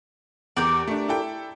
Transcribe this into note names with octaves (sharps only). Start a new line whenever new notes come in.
E2 G4 A#4 D5
A3 D4
E4 A4 G5